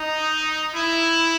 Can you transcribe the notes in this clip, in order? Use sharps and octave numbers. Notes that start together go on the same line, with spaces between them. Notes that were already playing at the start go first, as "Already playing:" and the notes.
Already playing: D#4
E4